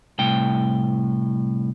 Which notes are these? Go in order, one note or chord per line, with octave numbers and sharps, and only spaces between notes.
C2 A2 G5